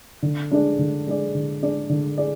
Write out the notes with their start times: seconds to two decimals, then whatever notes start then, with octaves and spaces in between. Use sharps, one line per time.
0.22 D3
0.51 G#3 D4 G#4 D5
0.79 D3
1.06 G#3 D4 G#4 D5
1.35 D3
1.62 G#3 D4 G#4 D5
1.89 D3
2.18 G#4 D5